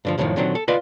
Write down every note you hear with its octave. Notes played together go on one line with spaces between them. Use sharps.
G2 D3 F3
C2 F#2 A2 C3 D#3 F3
A#2 D3 D#3 F#3 C4
A4
F4 B4 D5 D#5 B5 C6